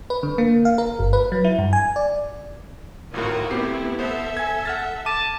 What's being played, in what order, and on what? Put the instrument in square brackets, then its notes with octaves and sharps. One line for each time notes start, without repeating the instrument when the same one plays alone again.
[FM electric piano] B4
D3
A#3
F5
A#4
G1
B4
F#3
E4
G2
G#5
D5
[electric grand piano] G#1 A2 [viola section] F4 F#4 A#4
[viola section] A3 B3 E4 [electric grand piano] C4 G4 C7
[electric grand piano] B3 C5 [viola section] A4 E5
[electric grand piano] G#5 G#6
F#5 F6 A6
[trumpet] A5 [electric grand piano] D6 D#7